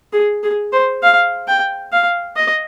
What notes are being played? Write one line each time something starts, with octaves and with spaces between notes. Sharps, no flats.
G#4
G#4
C5
F5
G5
F5
D#5